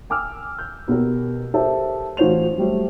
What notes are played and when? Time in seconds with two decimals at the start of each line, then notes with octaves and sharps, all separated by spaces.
0.10 G5 G#5 D6 E6 F6
0.59 G6
0.88 B2 B3 G4 A#4
1.54 G4 A4 A#4 C5 E5
2.17 A1 F4 F#4 C5 C#5 F7
2.58 F#3 G3 A3 C5